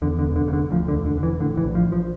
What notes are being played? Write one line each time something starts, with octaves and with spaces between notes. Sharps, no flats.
E2 D3
D3
E1
D3
C#3
D3
D2 F3
D3
E1
D3
D3
E3
A2 D3
E3
A#1
F3
A#1
F3